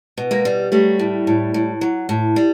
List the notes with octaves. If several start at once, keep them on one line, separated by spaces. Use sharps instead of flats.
B2
G#3 A#3
G3
F#3 G3 A3
A2
A2
A2
F#3
A2
G3